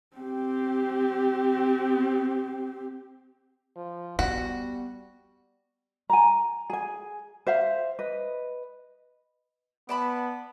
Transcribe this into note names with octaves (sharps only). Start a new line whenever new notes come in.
C4 G4
F3
G3 B3 F#4
G#5 A#5
G#4 G#5
C5 E5 F5
B4 D#5
B3 D5 A5 B5